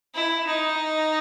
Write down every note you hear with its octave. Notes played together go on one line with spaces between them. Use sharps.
E4
D#4